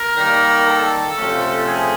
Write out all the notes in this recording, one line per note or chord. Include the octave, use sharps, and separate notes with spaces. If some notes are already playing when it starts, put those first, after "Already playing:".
Already playing: A#4
D#3 G3 A#3
A4
C3 F3 A3 C#4
G#4